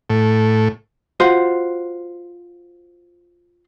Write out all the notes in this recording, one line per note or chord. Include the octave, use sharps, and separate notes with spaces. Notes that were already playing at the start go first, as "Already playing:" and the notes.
A2
F4 F#4 C5